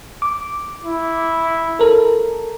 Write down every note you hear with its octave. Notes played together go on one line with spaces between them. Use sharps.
D6
E4
A4 A#4